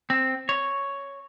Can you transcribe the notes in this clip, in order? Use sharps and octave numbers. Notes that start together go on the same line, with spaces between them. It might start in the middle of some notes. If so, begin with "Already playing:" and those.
C4
C#5